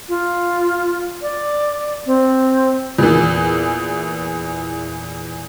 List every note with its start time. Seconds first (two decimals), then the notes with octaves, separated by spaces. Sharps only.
0.09 F4
1.22 D5
2.06 C4
2.98 E2 A#2 E3